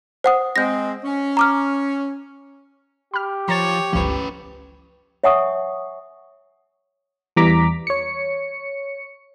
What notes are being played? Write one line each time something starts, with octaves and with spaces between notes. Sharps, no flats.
C5 F#5 D#6
G#3 C4 G6 A#6
C#4
A#5 D6 F6
G4 B5 F6
F3 C#5 A#5 A6
G1 C#2 F3 C#4 B4
C#5 E5 F#5 G#5 C#6 D#6
E2 E3 G3 A#5 D6 B6
C#5 C#7